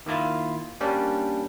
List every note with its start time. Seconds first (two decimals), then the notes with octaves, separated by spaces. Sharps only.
0.06 D#3 A#3 E4 F4
0.81 G3 A#3 C#4 D4